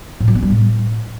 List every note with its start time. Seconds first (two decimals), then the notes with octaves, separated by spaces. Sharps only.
0.20 A2
0.28 F#3
0.35 C#4
0.43 G3
0.50 A2